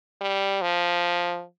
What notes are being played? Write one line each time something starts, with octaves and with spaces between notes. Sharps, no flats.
G3
F3